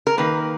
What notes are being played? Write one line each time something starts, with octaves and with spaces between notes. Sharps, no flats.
A#4
D#3 A#3 B4